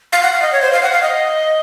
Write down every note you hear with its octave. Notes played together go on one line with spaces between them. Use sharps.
F5
F#5
F5
D#5
C#5
C5
F5
F#5
F5
D#5